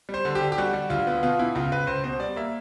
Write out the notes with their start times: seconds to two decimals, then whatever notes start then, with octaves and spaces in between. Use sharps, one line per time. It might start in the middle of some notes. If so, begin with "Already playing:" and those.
0.09 G3
0.14 C5
0.25 D3
0.35 G4
0.41 D3
0.52 G4
0.58 G3 F#4
0.73 G3
0.90 D2 F4
1.07 B3
1.23 B2 F4
1.39 B2 E4
1.55 C#2 F4
1.72 C#2 B4
1.87 C#2 C5
2.04 B2 C5
2.20 G3 D5
2.36 A#3 E5